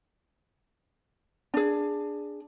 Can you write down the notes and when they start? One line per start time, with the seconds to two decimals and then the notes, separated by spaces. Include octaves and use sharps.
1.54 D4 G#4